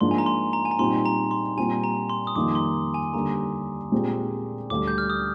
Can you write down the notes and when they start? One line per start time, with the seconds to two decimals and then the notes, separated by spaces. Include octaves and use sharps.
0.01 G#2 F3 A#3 D4 C6
0.11 G#5
0.18 A#5
0.26 C6
0.53 A#5
0.65 G#5
0.71 A#5
0.79 A#2 G3 C4 D#4 C6
1.06 A#5
1.31 C6
1.57 A#2 G3 C4 G4 G#5
1.84 A#5
2.10 C6
2.27 D#6
2.35 F2 D#3 G3 A#3 D#4 D6
2.55 C6
2.94 G#5
3.14 D#2 D3 G3 A#5
3.92 A#2 G#3 C4 G4
4.70 D2 D3 G3 D6
4.88 G6
4.98 F6
5.10 D#6